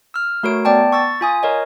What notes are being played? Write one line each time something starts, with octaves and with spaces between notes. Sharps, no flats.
E6 F6
A3 F#4 A#4 C#5 D7
B3 D5 G5 A5
C#6 E6 A6
F4 G#5 D#6
A#4 C#5 D#5